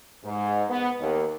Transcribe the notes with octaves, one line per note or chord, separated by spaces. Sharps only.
G#2
B3
D#2